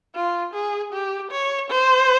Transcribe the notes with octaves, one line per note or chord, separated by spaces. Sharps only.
F4
G#4
G4
C#5
C5